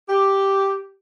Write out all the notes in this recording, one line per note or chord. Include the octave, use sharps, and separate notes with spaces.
G4